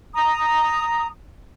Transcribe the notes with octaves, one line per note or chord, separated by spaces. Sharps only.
A#5 D#6